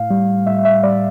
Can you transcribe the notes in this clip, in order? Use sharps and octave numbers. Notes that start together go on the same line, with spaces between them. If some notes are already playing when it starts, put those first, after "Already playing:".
Already playing: A2 F5
G3
A2 E5
E5
G3 D5